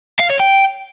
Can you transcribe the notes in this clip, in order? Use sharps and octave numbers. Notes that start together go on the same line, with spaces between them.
F5
C#5
G5